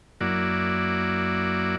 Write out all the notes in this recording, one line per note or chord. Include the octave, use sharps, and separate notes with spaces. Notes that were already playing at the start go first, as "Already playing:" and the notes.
F#2 A#3 E4 F#4 D5